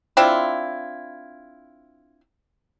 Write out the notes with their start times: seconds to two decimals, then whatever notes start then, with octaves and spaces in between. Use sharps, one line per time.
0.17 C4 D4 E4 F4